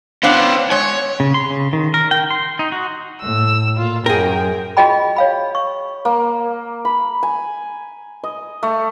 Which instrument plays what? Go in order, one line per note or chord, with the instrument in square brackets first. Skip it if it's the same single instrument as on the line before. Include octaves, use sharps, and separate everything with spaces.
[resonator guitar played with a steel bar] B3 D4 F5 [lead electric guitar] C#4 C5
[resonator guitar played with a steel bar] G#3 [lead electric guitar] C#5
[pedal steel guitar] C#3
C6
C#3
D#3
A#4
G5
C6
D#4
F#4
[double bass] A2 [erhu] E6
[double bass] A#2 [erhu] F4
[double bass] F#2 [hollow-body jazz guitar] G#4 A#4 [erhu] G5
[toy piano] F4 F#4 G#4 D#5 G5 B5
C#5 F5 B5
C#6
[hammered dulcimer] A#3
B5
G#5
D#5
A3